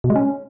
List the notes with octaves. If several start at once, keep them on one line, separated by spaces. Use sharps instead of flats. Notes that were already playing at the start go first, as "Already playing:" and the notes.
B2
G#3
C#4